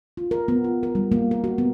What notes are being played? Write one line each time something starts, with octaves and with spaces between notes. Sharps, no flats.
F4
A#4
B3
F4
A#4
G3
A#3
A#4
F#4
B3